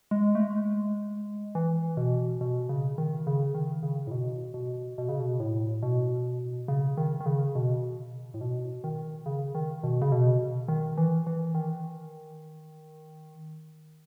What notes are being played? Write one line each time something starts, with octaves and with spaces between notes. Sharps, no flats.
G#3
A3
G#3
E3
B2
B2
C#3
D#3
C#3
D#3
C#3
A2
B2
B2
B2
C#3
B2
A2
B2
C#3
D#3
D#3
C#3
B2
A2
B2
D#3
C#3
D#3
B2
C#3
B2
D#3
E3
E3
D#3